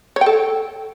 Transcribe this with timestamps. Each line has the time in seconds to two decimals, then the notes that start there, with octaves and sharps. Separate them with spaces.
0.16 C#5
0.21 G5
0.26 A4